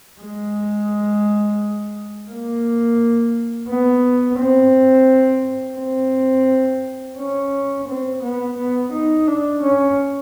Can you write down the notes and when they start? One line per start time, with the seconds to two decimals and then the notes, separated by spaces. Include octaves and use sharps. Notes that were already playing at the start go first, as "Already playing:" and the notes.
0.21 G#3
2.30 A#3
3.69 B3
4.39 C4
5.78 C4
7.18 C#4
7.88 C4
8.23 B3
8.58 B3
8.93 D#4
9.27 D4
9.63 C#4